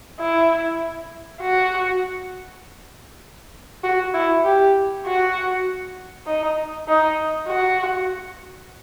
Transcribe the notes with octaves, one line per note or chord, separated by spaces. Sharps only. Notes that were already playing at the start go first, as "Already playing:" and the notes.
E4
F#4
F#4
E4
G4
F#4
D#4
D#4
F#4